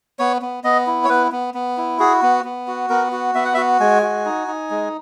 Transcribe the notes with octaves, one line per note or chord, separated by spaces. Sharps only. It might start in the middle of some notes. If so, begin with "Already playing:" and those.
B3 C#5
B3
B3 D#5
E4
C#5
B3 B4
B3
B3
E4
F#4 G#4
B3
B3
F#4
B3 A#4
F#4
B3 E5
F#5
E5
F#4
G#3 G#5
F#4
D#4
D#4
G#3